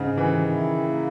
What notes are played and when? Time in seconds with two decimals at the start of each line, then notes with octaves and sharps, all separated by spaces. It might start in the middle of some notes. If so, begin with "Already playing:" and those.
Already playing: G#2 C#3
0.17 D#3 E3
0.51 E4
0.86 A#3